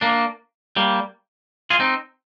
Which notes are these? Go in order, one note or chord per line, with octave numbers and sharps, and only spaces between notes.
A#3 D4
G3 A#3
F4 G#4
C4 D#4